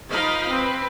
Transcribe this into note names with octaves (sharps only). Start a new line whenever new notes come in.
F3 D#4 A#4 D#5 F5 B5
C4 B4